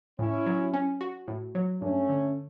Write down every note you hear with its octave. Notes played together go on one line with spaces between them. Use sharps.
A2 C#4 E4
F#3
C#4
F#4
A2
F#3
G2 A3 C#4
D3